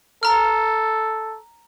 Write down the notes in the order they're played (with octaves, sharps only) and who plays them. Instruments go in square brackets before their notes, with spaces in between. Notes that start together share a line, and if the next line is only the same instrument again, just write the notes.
[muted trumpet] A4 [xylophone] A#5 F6